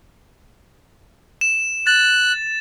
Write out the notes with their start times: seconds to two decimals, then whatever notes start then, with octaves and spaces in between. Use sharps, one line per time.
1.41 E7
1.87 F#6 A6